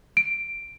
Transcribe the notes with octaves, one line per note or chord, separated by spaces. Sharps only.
D7